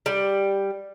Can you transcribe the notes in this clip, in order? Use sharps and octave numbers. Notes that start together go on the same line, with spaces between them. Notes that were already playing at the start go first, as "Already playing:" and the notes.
G3